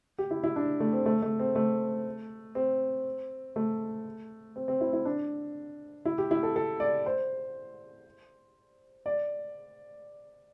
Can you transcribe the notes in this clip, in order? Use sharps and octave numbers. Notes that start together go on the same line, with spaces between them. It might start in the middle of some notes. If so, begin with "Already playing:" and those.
G4
E4
E4
D4
A3
C4
A3
A3
C4
A3
C4
A3
C4
C4
E4
E4
D4
E4
G4
E4
A4
A4
D5
C5
D5